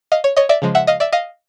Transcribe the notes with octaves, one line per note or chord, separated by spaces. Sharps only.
D#5 F5
C#5
C#5 D#5
D5 E5
C#3 F3 G#3
E5 F#5
D#5 F5
D5 E5
D#5 F5